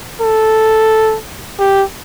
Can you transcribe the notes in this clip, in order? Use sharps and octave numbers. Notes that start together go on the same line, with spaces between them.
A4
G4